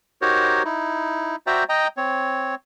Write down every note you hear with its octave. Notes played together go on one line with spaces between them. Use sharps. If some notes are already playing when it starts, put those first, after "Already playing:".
D#4 F#4 G4 A#4 C5 C#5
D#4 E4
F#4 C5 D5 E5 G5 A#5
D#5 G5 A#5
C4 C#5